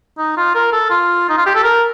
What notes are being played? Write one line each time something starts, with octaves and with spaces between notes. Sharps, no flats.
D#4
F4
A#4
A4
F4
D#4
F4
G4
A4
A#4